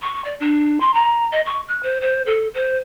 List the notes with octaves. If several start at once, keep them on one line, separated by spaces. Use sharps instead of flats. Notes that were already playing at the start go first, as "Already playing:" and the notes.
C#6
D5
D4
C6
A#5
D#5
C#6
F#6
C5
C5
A4
C5